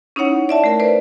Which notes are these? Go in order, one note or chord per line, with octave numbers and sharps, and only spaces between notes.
C#4 D#4 E4 C#5 F#5
D5 E5 A5
A3 A#4 A5
B4 C5 D5